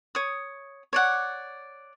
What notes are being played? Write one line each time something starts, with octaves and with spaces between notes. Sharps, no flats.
C#5 D#6
C#5 D5 F#5